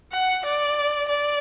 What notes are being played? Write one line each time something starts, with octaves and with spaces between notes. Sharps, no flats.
F#5
D5
D5